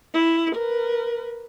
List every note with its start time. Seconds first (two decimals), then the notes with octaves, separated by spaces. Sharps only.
0.14 E4
0.54 A#4 B4